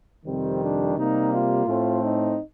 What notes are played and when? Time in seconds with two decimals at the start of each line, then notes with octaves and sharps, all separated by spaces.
0.25 F2 C3 D#3 G3 C4
0.60 D4
0.96 C3 G3 A#3 D#4
1.31 F4
1.66 A2 A3 C4
2.01 D#4